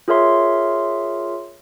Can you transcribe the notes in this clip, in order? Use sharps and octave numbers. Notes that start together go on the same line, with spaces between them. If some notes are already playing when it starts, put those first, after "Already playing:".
F4 G#4 A#4 C#5 E5 C6